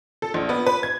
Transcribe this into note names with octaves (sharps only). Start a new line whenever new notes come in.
A4
A#1
B3
B4
G#6